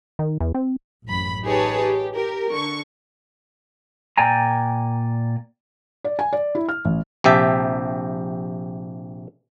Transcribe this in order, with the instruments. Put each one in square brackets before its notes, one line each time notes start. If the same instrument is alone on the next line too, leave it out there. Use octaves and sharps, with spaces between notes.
[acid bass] D#3
E2
C4
[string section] A1 F#2 B5
D#4 G4 G#4 B4 C#5 A5
G4
G4 A#4
D3 C#6
[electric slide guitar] A#2 D5 G5 G#5 A#5
[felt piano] D5
G#5
D5
E4
F6
A1
[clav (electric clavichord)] A#1 C3 G4 E5 A5